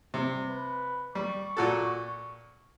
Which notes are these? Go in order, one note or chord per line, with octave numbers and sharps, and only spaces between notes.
C3 G3
B4
G3 C#6
A#2 F#4 A4